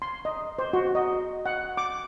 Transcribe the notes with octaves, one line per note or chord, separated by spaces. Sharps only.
C6
D#5
C5
F#4
D#5
F#5
D6